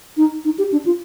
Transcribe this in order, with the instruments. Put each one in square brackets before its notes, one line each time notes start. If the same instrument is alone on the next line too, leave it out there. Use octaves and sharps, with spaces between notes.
[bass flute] D#4
D#4
G4
D4
F4